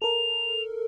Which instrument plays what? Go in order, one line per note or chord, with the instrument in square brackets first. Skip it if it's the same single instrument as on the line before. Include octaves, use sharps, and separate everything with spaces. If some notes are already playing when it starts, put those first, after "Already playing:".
[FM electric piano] A4 A#4 [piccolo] F7